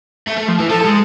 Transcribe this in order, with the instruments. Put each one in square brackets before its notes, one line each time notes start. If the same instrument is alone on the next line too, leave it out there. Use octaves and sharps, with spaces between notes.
[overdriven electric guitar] A3
A3
F3
E3
[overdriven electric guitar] F3 [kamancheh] A4
[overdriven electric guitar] G#3